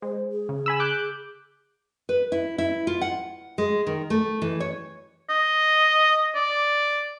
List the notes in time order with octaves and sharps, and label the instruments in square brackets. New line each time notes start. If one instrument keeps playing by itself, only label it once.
[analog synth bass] G#3 [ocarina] C5
[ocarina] G#4
[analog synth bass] C#3
[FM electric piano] G#5 B5 E6
D6 F#6 G6
[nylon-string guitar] B4
E4
E4
F4
F#5
G#3
D#3
A3
E3
C#5
[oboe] D#5
D5